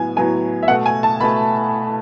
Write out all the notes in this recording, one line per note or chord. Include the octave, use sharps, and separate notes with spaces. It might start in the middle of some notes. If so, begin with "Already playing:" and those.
Already playing: A2 F#3 B3 G#5
A2 F#3 B3 G#5
E5
B2 A3 F#5
G#5
A5
B2 A3 B5